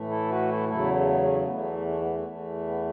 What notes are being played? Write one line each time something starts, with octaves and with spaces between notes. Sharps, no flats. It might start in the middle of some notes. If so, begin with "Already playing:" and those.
Already playing: A2 E3 A3
E4 A4
F#4 B4
E4 A4
E2 C#3 F#3 A3 E4 A4
B3
B3
A3 C#4
B3
E2 E3 A3 B3
A3
B3
A3
E2 E3 A3
B3